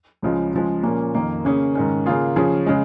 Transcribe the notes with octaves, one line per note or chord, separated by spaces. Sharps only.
C#2 C#3 F3 G#3
C#3 F3 G#3
A#2 F3 A#3 C#4
F2 D#3 A#3
C#3 A#3 C#4 G#4
G#2 D#3 C#4
C#3 A#3 F4 G#4
C#3 F3 C#4 G#4
C#3 G#3